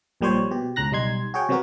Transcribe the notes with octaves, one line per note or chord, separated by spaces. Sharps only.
A#1 A#2 G3 G4 C5 C#5
B2 G4
C#2 C#3 A#5 F#6 A#6
B1 G3 D#4 C6 G#6
F#4 G#4 C#5 G5
C3 F#3 B3 F#4 A#4